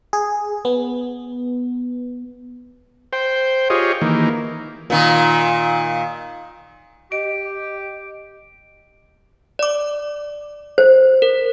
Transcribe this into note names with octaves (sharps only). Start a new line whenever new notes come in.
G#4
B3
C5 G5
F4 G4 G#4 C#5 D#5
D#3 E3 A#3
A#2 D#3
G4 D#5 D7
D5 D6
C5
A#4